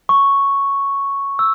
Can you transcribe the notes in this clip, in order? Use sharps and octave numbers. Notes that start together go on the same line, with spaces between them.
C#6
E6